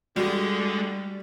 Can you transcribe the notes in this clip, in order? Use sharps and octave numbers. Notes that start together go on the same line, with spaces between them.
D3 G3 G#3 F#4 G4